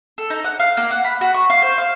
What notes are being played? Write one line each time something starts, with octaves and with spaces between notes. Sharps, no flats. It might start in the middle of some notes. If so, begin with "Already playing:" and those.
A4
D#4
F#5
F5
A#3
F#5
B5
F#4
C#6
F5
C5
F5